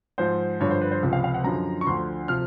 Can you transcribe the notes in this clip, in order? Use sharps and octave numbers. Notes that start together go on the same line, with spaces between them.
G#2 F3 C5
G2 D3 F3 C#5
C5
B4
C5
C#2 C3 F3
F5
F5
F#5
F#2 D3 F3 A#5
C#6
D2 D3 F3 C6
C3 F3 F6